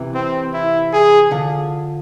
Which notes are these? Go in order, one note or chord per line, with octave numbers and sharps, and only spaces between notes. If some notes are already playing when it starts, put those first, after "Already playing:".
Already playing: C3 E3
C4
E4
G#4
D3 F3